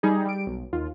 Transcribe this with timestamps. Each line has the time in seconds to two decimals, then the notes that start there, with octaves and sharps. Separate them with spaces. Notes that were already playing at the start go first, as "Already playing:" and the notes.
0.03 G3 D#4 G#4
0.25 G3 D7
0.47 B1
0.73 D#2 F4